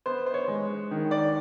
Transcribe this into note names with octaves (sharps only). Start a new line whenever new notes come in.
B3 C5
C5
C#5
G#3
D#3
D5